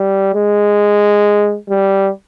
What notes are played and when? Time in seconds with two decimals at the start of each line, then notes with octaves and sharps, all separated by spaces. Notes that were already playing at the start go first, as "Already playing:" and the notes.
Already playing: G3
0.34 G#3
1.70 G3